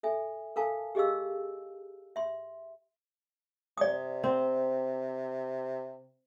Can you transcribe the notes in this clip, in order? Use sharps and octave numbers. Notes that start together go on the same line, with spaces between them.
A4 E5 G#5
A4 A#4 F5 G#5 A5
G4 G#4 D#5 F5 E6
E5 C6
C3 D5 D#6
C4